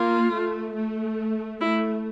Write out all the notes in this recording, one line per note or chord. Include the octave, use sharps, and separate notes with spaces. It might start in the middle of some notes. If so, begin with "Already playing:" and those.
Already playing: A#3 F4
A3
A3
A3 E4